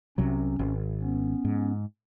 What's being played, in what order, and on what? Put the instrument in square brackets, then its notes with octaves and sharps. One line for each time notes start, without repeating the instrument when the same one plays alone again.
[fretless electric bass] C2 C3 F#3 [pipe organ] C#4
[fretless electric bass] G#1
[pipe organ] B3 C#4
[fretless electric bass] G#2